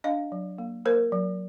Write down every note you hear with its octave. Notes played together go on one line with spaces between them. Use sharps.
D4 D#5 F5
F#3
A#3
A#3 A#4 C5
F#3